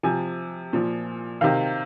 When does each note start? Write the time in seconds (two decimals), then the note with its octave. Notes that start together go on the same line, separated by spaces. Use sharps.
0.03 C3 F3 G#5
0.73 A#2 F3
1.41 C3 D#3 F5